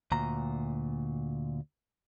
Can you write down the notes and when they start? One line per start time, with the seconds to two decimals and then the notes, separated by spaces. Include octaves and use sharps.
0.12 D2 A#2 A#5